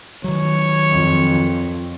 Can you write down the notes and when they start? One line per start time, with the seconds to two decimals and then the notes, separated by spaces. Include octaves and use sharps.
0.24 D#3 F#3 C#5
0.91 F2